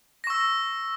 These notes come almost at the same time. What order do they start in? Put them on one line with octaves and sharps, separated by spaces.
A#6 C#6 E6